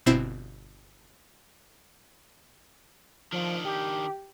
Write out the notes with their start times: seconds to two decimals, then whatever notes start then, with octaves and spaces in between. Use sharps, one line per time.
0.06 G1 B2 C4 E4 C5 E7
3.32 D#3 F3 D4
3.65 G4